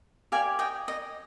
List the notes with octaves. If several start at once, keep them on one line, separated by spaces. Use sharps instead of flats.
G4 D5 F5 G#5
D#5 G5
D#5